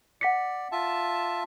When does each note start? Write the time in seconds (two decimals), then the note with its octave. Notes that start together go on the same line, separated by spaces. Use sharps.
0.21 D5 F#5 B6 C#7
0.72 F4 E5 A5